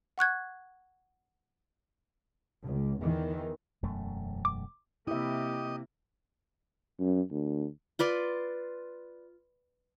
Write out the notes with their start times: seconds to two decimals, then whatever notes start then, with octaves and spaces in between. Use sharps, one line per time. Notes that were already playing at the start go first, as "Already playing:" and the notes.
0.18 F#5 C#6 F#6 G#6
2.64 C#2
3.01 E2 D#3 E3
3.83 E1 F#2 A3
4.45 D6
5.07 C3 A#3 E4 G4 D#5 E5
7.00 F#2
7.31 D2
7.99 F4 B4 D5 C6